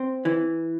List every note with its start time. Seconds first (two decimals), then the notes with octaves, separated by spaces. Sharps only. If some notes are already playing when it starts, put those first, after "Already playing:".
Already playing: C4
0.25 E3